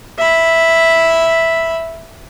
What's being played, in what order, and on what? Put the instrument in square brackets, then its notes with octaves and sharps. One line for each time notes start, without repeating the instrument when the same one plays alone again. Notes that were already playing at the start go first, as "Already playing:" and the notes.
[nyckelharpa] E5 B5